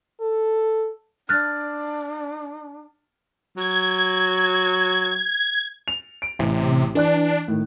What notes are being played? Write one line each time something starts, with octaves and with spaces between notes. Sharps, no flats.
A4
D4 F6 F#6 A6
F#3 G#6
F7
D7
A1 C3
E3 D4 D5 F#6
A2 D#3